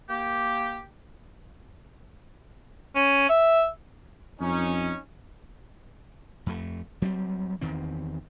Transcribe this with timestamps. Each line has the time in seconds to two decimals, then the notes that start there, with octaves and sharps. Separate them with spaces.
0.09 A#3 G4
2.96 C#4
3.29 E5
4.40 F2 C#4 D#4
6.46 F2 A3
7.02 F#3 G3 B3 C4
7.61 E2 D#3 C4